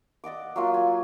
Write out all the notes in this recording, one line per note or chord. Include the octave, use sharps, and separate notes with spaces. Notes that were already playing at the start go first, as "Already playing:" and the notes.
D5 D#5 F#5 D6
F#3 A#3 F4
G#5